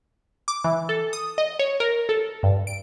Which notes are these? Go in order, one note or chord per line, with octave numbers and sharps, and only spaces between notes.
D6
E3
A4
D#6
D#5
C#5
A#4
A4
G2
D7